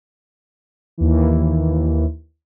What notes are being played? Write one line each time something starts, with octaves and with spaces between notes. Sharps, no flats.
D#2 E3